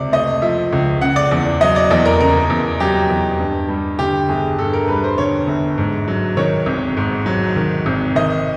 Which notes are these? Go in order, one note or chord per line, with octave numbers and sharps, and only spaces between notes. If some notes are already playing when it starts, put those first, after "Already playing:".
Already playing: C#2 C3 D5
A3 D#5
F3 E5
C#2
C#3 F#5
D5
E2 D5
F#3 D#5
D5
E2 D5
A#4
C#3 A#4
E2
F#3 G4
E2
G2
G3
D3 G4
G1 G#4
G2 A4
A#4
G3 B4
C5
D3 C#5
G1
G#2
F#3
D#3 C#5
G#1
G#2
F#3
D#3
G#1
D#3 D#5